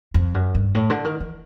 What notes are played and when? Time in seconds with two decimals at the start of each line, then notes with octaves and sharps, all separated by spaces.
0.14 F2
0.34 F#2
0.55 G2
0.75 A2
0.90 D3
1.05 D#3
1.20 E3